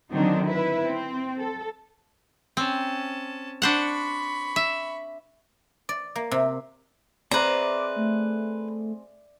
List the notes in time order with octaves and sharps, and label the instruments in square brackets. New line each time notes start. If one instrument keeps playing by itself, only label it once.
[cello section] D3 D#3 F#3 C4 D4 D#4
E4 B4
C4
A4
[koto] C4 [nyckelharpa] C#4 A5
[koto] D4 C5 F#5 [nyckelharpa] B5 C#6
[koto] E5
[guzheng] D5
A#3
C3
[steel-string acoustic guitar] C4 G#4 C5 [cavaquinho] B4 A#5 [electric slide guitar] D5 E5 [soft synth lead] D6
[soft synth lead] A3